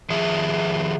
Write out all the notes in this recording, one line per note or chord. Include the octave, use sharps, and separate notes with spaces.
D#3 F3 G#4 E5